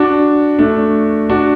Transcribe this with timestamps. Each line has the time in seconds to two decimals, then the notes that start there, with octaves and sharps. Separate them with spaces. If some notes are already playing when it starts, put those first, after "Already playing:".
Already playing: D4 F#4
0.59 A3 D4
1.29 D4 F#4